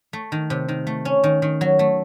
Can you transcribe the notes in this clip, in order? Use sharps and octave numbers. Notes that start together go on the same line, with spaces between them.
A3
D#3
C3
D#3
A3
C#4
D#3
D#3
F#3
A3